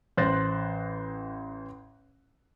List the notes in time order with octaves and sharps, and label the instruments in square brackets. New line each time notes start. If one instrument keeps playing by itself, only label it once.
[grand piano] A1 C5 F#6 A6 A#6